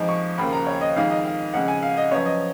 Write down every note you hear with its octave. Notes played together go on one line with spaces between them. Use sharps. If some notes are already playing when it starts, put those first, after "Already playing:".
Already playing: F2 F3 G#3 D#4
C#6
D#2 C#3 F3 A#3 B5
A#5
C#5
D#5
F2 D#3 G#3 D#4 F5
D#5
F5
F2 C#3 G#3 F#5
G#5
F5
D#5
F#2 F3 B3 C#5
D#5